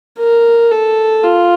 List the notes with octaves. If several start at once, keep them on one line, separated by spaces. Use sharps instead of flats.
A#4
A4
F4